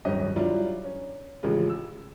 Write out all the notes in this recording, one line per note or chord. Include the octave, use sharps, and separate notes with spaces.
D1 G1 G2 D#3 C#4 D#5
F#3 G3 D4 E4 F4
C#4
A1 C#3 F3 G#3 F4
E6